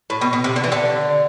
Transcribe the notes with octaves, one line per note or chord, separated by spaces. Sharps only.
A2
B2
B2
C3
D3
E3
D3